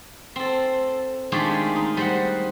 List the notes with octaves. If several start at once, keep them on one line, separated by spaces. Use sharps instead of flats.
C4 A4
D#3 G#3 A3 D4 F4 G4
D#4
G3 C5 F#5